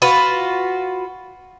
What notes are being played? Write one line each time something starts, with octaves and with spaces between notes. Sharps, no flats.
F4 F#4 B4